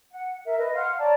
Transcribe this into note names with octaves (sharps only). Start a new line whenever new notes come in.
F#5
A#4 E5
B4 D#5
F5 F#5 C6 F6
C#5 D5 A5 A#5